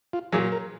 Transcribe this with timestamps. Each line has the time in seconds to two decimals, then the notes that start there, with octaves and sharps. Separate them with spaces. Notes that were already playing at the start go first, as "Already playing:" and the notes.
0.13 F4
0.32 A#2 F#3 G#4
0.52 A#4